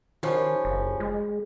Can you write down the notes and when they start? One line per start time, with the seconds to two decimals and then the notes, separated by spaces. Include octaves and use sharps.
0.23 G2 D#3 F3 C#4
0.65 F#1
1.00 G#3